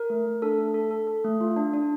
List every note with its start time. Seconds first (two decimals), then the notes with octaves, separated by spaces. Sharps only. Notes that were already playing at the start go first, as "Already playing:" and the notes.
Already playing: A#4
0.10 A3
0.26 A3
0.42 D4 A4
0.58 A3
0.74 A4
0.91 A4
1.07 A4
1.24 A3
1.41 F4
1.56 D4
1.74 D4